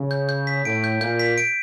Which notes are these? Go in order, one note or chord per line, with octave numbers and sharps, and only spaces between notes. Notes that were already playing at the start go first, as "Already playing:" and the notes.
Already playing: C#3
G6
G6
B6
A2 D7
G6
A#2 G6
B6
D7